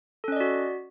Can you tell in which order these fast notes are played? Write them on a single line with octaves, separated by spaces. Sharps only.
A4 C#4 D#5 D5 F#4